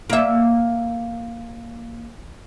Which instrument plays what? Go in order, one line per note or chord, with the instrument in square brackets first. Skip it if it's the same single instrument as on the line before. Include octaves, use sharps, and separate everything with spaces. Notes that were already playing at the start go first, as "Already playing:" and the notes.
[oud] A#3 E5